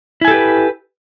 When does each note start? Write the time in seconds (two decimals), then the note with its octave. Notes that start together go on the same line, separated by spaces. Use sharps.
0.21 E4
0.25 G#5
0.28 A4
0.31 G4
0.34 B4